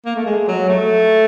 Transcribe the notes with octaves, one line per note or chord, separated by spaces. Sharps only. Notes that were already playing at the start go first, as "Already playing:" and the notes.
A#3
A3
G#3
F#3
A3